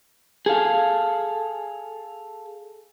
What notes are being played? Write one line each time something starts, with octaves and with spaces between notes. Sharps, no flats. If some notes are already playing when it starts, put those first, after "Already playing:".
G#4 A4 F5